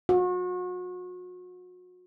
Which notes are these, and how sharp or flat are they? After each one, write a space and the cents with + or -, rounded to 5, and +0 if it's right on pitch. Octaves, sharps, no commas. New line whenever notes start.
F#4 -35